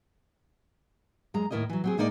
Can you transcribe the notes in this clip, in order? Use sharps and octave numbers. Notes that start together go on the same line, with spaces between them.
F#2 G#3 A#5
D#2 A2 E4 A#4 C#5 D#5
E3 F#3
F#3 C4 G#4
A2 G#3 A#3 D#4 A#4 D5